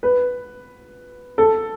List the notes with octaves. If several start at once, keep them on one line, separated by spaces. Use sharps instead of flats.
B4
A4